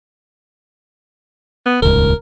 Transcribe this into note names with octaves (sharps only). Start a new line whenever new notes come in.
B3
D#1 C#2 G#2 A#4